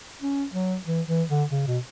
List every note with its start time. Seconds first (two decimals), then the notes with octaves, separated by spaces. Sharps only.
0.22 C#4
0.54 F#3
0.86 E3
1.08 E3
1.29 D3
1.51 C#3
1.67 B2